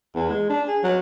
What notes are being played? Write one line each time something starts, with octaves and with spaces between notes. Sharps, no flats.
E2
G#3
D4
G#4
F#3